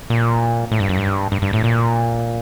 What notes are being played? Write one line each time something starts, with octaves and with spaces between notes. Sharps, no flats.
A#2
A2
G2
F#2
G2
G2
G2
A2
A#2